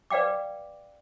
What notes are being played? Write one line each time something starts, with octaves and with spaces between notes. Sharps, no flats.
B4 D5 F5 G5 D6